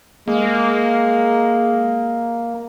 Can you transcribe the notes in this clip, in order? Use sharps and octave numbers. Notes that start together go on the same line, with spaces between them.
G#3 A#3